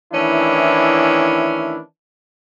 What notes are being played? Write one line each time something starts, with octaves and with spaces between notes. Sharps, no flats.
D#3 E3 A3 C#4 D4 E4